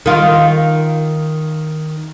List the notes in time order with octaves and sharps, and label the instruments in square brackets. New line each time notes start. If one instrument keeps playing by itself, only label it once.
[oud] D#3 F4